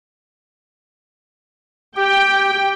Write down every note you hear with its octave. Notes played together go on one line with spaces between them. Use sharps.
G4 G5